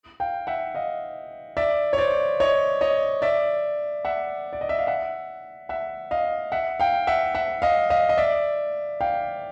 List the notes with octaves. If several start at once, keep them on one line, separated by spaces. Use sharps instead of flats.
F5 G5
E5 F#5
D#5 F5
D5 E5
C#5
C5 D5
C#5 D#5
C#5 D#5
D5 E5
E5 F#5
D5
D#5
E5
F5
E5 F#5
E5 F#5
D#5 F5
E5 F#5
F5 G5
E5 F#5
E5 F#5
D#5 F5
D#5 F5
D#5
D5 E5
F5 G5